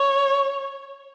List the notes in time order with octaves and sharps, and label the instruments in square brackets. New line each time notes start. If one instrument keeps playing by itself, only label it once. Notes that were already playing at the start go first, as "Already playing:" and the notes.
Already playing: [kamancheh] C#5